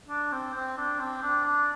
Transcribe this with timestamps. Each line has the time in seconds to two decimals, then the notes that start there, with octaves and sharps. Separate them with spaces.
0.09 D4
0.32 C4
0.54 C4
0.77 D4
1.00 C4
1.22 D4
1.45 D4